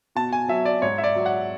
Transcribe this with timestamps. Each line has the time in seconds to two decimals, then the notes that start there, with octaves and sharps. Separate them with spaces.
0.15 B2 A5
0.33 G#5
0.48 F#3 E5
0.65 D5
0.82 G#2 C#5
0.98 E5
1.04 D5
1.15 F#3
1.26 F#5